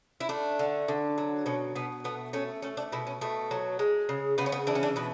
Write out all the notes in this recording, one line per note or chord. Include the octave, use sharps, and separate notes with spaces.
E4
A3 D4
D3
D3
F#3
B2 C#4
B2 B3
A3 B3
A3 C#4
A3 C#4
D4
B2 E4
C#4
B2 A3
F#3
G#3
C#3
C#3 B3
C#4
B3
E3 D4
C#4
D4
B2 B4